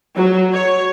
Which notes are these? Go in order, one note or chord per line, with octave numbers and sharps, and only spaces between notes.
F#3
C#5